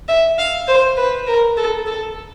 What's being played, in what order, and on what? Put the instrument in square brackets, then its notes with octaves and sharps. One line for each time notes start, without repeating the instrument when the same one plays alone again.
[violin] E5
F5
C5
B4
A#4
A4
A4